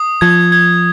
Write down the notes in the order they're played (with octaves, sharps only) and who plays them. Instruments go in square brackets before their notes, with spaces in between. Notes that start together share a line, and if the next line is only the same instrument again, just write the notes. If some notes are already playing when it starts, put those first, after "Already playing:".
Already playing: [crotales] D#6
[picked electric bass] F3 [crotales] G#6
[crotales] G#6